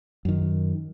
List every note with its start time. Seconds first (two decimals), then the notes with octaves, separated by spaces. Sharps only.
0.25 F#2 D#3